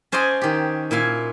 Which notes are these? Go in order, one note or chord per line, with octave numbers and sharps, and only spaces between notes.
C#4 C5 D5 D#5 G#5
D#3 G4
A#2 E4 F5 G#5